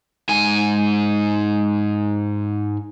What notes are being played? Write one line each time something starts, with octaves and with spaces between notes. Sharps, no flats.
G#2 G#5